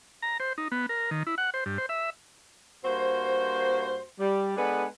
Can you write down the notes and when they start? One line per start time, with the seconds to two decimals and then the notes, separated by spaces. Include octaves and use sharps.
0.22 A#5
0.40 C5
0.58 D#4
0.72 B3
0.89 A#4
1.11 D#3
1.27 E4
1.38 F#5
1.54 C5
1.66 G2
1.78 C5
1.89 E5
2.84 G2 A#3 F#4 C5
4.19 G3
4.56 G#3 B3 D4 G#4 A4 B4